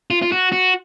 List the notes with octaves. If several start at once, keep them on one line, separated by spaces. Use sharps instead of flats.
F4
F4
F#4
F#4